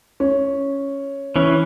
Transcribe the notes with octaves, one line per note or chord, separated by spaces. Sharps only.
C#4
E3 C#4